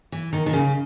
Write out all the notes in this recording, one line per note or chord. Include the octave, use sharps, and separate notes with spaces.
E3
D#3
D#3
C#3